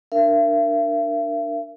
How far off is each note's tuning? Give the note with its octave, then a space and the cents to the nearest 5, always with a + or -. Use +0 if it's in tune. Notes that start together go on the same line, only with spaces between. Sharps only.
D4 +15 A#4 +0 E5 +40